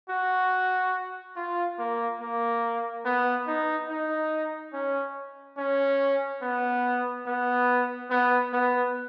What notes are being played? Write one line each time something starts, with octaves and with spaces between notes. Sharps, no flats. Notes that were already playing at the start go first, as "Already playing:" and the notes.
F#4
F4
A#3
A#3
B3
D#4
D#4
C#4
C#4
B3
B3
B3
B3